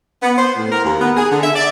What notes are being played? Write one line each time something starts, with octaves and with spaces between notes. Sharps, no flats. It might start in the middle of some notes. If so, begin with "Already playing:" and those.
B3
C5
A2
A#4
D#2
B3
G#4
D3
E5
D5